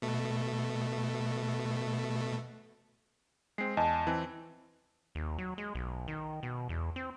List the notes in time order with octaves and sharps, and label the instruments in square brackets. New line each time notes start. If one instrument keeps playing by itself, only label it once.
[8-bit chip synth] B2 A3
[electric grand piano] G#3 C4 [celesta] C7
[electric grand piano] E2 [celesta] D#5 G#5 A5
[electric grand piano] E3 C4
[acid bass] D#2
F#3
G#3
B1
D#3
B2
E2
C4